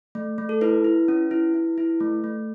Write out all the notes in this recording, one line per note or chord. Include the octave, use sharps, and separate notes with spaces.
A3
A3
A4
E4 B4
E4
C#4
E4
E4
E4
A3
A3